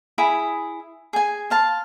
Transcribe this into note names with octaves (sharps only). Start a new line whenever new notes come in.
E4 G#4 B5
G#4 G#5
C5 F5 A5